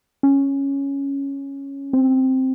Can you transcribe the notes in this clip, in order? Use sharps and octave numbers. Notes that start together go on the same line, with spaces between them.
C#4
C4